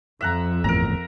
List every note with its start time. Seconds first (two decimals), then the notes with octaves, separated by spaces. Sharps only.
0.21 F2 E5 F#5 A#5
0.64 G1 E2 A2 A#4 A#5